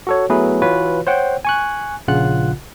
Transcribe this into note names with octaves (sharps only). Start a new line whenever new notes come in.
F#4 A4 C#5
F#3 A3 B3 E4 G#4 B4
E3 F4 F#4 B4 C#5
C5 C#5 F#5 G5
G#5 C#6 F#6
A#1 C#3 F4 F#5 F#6